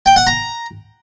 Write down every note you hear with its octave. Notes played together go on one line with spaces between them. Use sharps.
G5
F#5
A#5